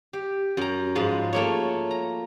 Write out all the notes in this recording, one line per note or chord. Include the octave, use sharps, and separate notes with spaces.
G4
F#2 A#5
G#2 F3 B4
A3 A#3 C#5
A#5